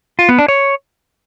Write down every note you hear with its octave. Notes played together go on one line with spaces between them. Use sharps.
F4
B3
D4
C#5